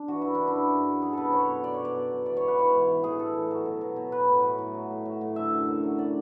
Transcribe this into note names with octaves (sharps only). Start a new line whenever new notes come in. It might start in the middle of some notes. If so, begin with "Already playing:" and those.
Already playing: D4
E3 F#4
F#2 E4
C#3 D4
E4
F#2
F#2
F#3
F#3 G#4
B2 A4 B4
F#3 C#5
B2
F#3 D5
C#5
B2
D5
F#3
B2
E3 D5
G#2 C#5
B4
E3 C#5
G#2
E3
A2 G#4
E3 A4
A2
F#3
B2
F#3
B2
F#3 B4
A2
F#3
A2
F#3
A2
F#3
A2
D3 E5
F#2
F#2
F#3
F#3 D5